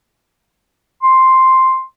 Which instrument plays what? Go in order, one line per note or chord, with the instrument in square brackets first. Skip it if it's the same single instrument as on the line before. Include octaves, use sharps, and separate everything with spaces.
[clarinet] C6